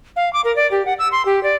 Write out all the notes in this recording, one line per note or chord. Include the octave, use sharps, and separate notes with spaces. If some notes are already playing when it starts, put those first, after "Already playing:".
F5
D6
A#4
D5
G4
F#5
E6
C6
G4
D5